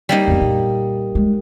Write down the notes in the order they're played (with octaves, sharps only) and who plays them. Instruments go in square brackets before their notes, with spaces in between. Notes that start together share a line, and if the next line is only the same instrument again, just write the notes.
[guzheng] G3 A#3 D#4
[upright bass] F2 B3
A#2
G#3